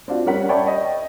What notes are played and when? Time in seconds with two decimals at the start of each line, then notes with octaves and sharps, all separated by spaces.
0.08 C4 D4 F4 F#4
0.26 G3 C#4 A#4 F#5 B6
0.49 C#5 D5 E5 G5 A5 B5
0.67 D#5 G5